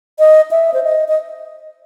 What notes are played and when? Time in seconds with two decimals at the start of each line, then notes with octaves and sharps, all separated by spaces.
0.19 D#5
0.51 E5
0.74 C5
0.84 D#5
1.08 D#5